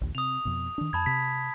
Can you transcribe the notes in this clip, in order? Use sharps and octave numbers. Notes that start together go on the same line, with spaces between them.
A#1 D#2
C3 D#6 F7
F2 B2
D#3 D4
F2 A5 B5 G#6
C3 B6